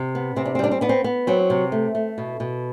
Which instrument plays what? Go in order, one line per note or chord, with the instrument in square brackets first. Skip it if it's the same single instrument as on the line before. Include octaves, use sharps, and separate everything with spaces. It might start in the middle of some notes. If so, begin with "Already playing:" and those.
Already playing: [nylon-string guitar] C3
B3
C3 C4
D4
C4
G3 D4
C4
B3 D4
C4
B3
F#3 C4
C3
A3
A3
B2
B2